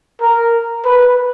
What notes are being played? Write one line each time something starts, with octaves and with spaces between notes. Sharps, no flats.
A#4
B4